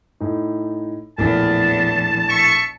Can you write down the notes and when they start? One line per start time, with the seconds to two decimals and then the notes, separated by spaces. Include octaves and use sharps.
0.20 A2 D#4
1.18 A#1 E2 A2 A5
2.28 E5 C#6